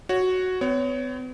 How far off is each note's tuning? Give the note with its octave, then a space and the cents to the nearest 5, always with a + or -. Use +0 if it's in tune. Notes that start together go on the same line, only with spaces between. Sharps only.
F#4 +0 C#5 +0
B3 +45 C#5 +20